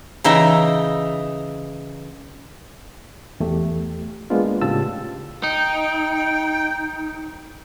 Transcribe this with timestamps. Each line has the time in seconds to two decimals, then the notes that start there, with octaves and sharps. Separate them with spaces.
0.24 C#3 E3 D#4 E5 G5 A#5
3.40 E2 A3 G4
4.30 G#3 A#3 B3 D4 F4
4.61 A2 C#3 F4 G4 A5 E6
5.43 D#4 G5